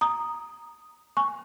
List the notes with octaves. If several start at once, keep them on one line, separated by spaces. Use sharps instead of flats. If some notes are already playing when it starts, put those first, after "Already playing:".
A#5 D#6
G#5 C#6